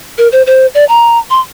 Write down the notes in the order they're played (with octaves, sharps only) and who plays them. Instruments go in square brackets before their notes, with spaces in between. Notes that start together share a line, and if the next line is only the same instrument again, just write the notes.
[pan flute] A#4
C5
C5
D5
A#5
C6